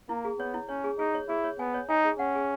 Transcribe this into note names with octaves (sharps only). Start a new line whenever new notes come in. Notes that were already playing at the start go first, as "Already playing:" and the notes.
A#3 E4
G#4
B3 C#5
E4
C#4 C#5
G#4
D#4 G#4
C#5
E4 G#4
C#5
B3 G#5
C#5
D#4 G#5
G#4
C#4 F#5
G#4